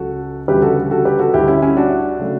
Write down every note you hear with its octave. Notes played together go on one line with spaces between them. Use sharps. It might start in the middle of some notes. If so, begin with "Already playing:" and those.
Already playing: C#2 C#3 F#3 F#4 A4
D2 C#3 E3 G3 G4 B4
F#4 A4
F#4 A4
G4 B4
F#4 A4
D2 D3 G3 E4 G4
C#4 E4
C#4 E4
D4 F#4
C#3 F#3 A3